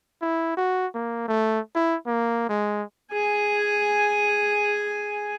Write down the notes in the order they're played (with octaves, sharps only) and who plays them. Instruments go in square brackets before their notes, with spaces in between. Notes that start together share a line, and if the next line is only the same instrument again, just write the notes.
[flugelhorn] E4
F#4
A#3
A3
E4
A#3
G#3
[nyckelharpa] G#4 G#5